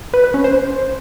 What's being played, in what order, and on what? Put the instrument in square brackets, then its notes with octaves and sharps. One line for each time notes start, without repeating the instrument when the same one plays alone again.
[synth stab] B4
B4
C#4
C5